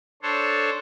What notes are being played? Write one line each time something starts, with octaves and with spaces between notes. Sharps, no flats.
D4 A4 C5 C#5